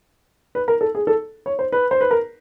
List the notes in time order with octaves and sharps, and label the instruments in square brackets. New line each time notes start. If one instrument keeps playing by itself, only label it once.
[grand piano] B4
A#4
A4
G#4
A4
C#5
C5
B4
C5
B4
A#4